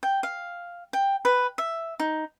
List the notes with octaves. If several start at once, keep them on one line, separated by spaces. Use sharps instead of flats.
G5
F5
G5
B4
E5
D#4